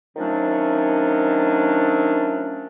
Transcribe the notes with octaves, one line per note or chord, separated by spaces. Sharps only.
D#3 F3 F#3 A3 C#4 D4